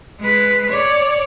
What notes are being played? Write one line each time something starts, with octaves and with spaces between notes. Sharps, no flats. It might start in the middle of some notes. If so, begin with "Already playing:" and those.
G#3 B4
C#5 D5